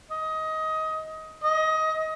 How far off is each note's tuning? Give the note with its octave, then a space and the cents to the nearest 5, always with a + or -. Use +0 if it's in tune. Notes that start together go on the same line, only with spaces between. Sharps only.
D#5 +20
D#5 +20